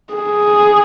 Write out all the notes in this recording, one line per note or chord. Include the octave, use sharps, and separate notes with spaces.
G#4